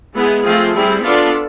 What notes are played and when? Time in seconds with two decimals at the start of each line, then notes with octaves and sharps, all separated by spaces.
0.13 G#3 B3 E4 G#4
0.43 F3 A3 C4 F4 G#4
0.74 G3 C4 E4 G#4
1.02 B3 D4 F4 A4 D5